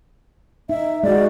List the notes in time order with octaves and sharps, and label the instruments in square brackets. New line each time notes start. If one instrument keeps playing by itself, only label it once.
[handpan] D#4 [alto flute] E5
[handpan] G#3 F#4 [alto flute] D5